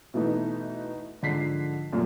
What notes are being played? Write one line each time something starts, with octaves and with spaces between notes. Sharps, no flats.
B2 E3 A3 B3 D#4
G#2 D3 F3 B6 C7
F#2 A#2 A3